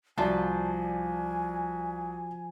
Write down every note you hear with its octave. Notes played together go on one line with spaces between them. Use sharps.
C2 F3 F#4 D5 G#5 A5